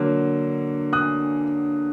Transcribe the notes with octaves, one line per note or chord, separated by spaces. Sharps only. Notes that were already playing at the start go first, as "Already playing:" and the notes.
Already playing: D3 F#3 A#3
D#6 F#6